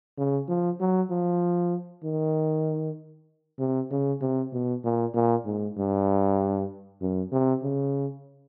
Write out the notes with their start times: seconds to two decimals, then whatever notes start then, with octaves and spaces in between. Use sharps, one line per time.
0.17 C#3
0.49 F3
0.80 F#3
1.10 F3
2.04 D#3
3.59 C3
3.91 C#3
4.21 C3
4.53 B2
4.84 A#2
5.14 A#2
5.45 G#2
5.77 G2
7.01 F#2
7.32 C3
7.63 C#3